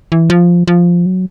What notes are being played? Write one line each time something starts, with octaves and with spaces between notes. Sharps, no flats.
E3
F3
F3
F#3